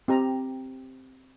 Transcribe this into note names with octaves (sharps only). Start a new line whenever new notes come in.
C4 G4 A#5